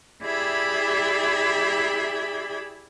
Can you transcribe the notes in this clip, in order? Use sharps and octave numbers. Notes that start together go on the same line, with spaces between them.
E4 G4 G#4 D5 E5 B5